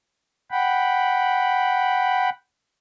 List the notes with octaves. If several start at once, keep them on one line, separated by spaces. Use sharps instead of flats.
F#5 G5 B5